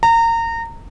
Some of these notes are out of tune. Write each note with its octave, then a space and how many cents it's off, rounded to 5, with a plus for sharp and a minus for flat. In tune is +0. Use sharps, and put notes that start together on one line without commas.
A#5 -25